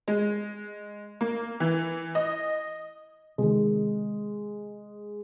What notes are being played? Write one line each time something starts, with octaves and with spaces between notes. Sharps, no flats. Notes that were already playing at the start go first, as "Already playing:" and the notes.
G#3
A#3
E3
D#5
C3 D#3 G#3